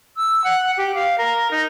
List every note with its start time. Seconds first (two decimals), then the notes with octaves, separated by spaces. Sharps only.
0.17 E6
0.44 F#5
0.77 G4
0.95 F5
1.18 A#4
1.51 D#4